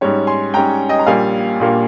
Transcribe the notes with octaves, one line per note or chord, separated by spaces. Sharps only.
G#2 G3 C#4 C#5
G#5 C6
G#2 G3 C#4 G5 A#5
D#5 G5
A#5
A#1 A#2 G3 A#3 F5 G#5
A#1 A#2 G3 A#3